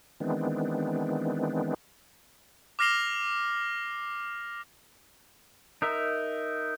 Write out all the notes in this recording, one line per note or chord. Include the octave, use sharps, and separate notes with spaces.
D#3 E3 G#3 B3 C4 D4
D6 F6 A#6 C7 F7 G7
D#4 A#4 E5